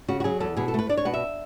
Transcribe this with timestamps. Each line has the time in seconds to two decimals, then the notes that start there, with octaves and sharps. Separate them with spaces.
0.08 C#3 F#4
0.20 F#4
0.24 F#3 G#4
0.40 E2 A4
0.57 B2 G#4
0.68 A4
0.74 A3 B4
0.89 D4 D5
0.97 C#5
1.05 B2 F#5
1.14 E5